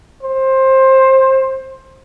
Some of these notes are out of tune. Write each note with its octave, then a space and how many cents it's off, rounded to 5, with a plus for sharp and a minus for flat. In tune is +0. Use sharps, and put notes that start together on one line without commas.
C5 +20